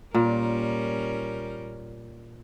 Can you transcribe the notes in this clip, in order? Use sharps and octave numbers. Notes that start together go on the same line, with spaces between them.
A#2 G3 C#4 A#4